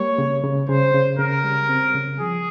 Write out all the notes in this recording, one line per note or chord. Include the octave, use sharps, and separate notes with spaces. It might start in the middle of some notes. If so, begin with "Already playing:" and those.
Already playing: G3 A#3 C#5
C#3
C#3
C#3 C5
C#3
C#3 A#4
G3
C4
C#3
F3 G#4